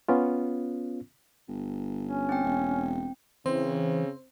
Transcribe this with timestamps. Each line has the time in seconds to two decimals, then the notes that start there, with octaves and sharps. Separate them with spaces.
0.09 B3 C#4 F4
1.48 G1
2.03 C#4
2.29 C4 G5
2.44 E1
3.46 C#3 E3 C4 C5